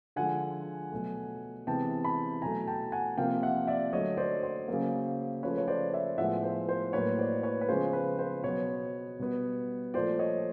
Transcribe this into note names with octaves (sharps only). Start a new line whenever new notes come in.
D3 F3 G#3 F#5 G#5
B2 F#3 A3
C3 E3 G#3 B3 G5 A5
A5 B5
B2 F#3 A3 G#5 A#5
G5 A5
F#5 G#5
C3 F3 A#3 F5 G5
E5 F#5
D5 E5
D3 F#3 A3 C#5 D#5
C5 D5
C5
C#3 F#3 A#3
C#3 F3 A3 B4 C#5
C#5
C5 D5
D5 E5
A2 F3 G#3 B3 E5 F#5
C5
C5
A2 F#3 A#3 B4 C#5
C5 D5
B4 C#5
B4
C#3 F3 G#3 B3 C5
B4
C5
B2 F#3 B3 B4 C#5
B2 G3 B3
A#2 F3 A3 C5 D5
C#5 D#5